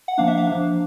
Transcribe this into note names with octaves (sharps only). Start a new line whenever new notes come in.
F#5
F3 A#3 D4 F5
E5
F5
F3 A#3 D4